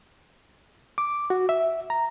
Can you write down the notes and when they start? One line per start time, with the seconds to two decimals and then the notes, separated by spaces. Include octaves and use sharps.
0.98 D6
1.30 F#4
1.49 E5
1.90 A#5